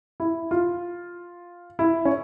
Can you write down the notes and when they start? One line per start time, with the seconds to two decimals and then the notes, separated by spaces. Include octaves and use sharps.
0.20 E4
0.51 F4
1.79 E4
2.05 C#4